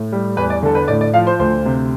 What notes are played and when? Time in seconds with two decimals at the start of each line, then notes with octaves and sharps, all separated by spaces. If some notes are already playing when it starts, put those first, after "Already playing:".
Already playing: A2
0.12 G3
0.37 E2 B4
0.50 D5
0.63 D3 A4
0.75 B4
0.88 A2 D5
1.01 D5
1.14 F3 F5
1.27 C5
1.39 D2 C5
1.65 C3